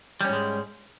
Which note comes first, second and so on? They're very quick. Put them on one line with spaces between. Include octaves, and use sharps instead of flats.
G3 C#4 G#2 G#3